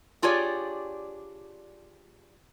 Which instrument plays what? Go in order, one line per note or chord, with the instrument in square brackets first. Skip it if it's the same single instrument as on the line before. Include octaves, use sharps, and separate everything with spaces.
[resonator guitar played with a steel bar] D4 F4 G4 G#4 C#5 D5